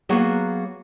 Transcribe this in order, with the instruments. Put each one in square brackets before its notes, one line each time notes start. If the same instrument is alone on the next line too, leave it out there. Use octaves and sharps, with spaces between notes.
[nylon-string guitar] F#3 A#3 B3 F#4 G#4